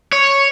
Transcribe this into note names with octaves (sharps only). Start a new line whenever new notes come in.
C#5